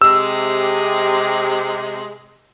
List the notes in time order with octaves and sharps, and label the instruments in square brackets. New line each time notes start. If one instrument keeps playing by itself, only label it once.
[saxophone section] C3 G#3 [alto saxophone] G4 [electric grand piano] E6